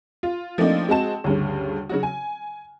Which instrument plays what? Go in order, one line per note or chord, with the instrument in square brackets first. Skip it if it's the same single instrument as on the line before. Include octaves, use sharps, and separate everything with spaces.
[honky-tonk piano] F4
F3 A3 A#3 C4 D4 D#4
G#3 C4 F#4 A5 E7
D2 G2 C#3
C#3 F#3 F#4
G#5